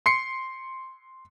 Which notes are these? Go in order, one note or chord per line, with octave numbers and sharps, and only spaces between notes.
C6 C7 C#7